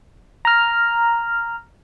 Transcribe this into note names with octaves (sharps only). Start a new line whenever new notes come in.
A#5 F6